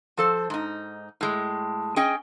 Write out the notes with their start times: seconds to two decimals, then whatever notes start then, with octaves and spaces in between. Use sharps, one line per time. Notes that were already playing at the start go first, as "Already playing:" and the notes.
0.17 F3 A4 C5
0.50 G#2 D#4
1.21 A2 G#3
1.96 C#4 G#4 D#5 G5